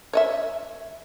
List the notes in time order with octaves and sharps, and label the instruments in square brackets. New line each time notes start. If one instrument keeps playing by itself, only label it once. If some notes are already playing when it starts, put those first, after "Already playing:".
[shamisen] C#5 D#5 E5